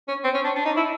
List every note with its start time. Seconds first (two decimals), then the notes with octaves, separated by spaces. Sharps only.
0.08 C#4
0.24 C4
0.34 C#4
0.44 D4
0.56 D4
0.65 D#4
0.77 E4